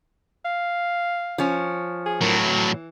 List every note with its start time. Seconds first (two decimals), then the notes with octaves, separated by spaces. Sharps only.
0.45 F5
1.38 F3 C#4
2.06 G#4
2.21 A2 F#3 A#4
2.39 E3